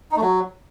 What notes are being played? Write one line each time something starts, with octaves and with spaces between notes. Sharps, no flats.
D#4
A3
F#3